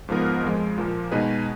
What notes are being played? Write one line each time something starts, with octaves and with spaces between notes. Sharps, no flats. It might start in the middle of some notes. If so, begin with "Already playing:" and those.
G#2 F3 B3 F4 A#4
F2 F3 G#3
A#2 F3 A#3
B2 G#3 D#4 G#4 B4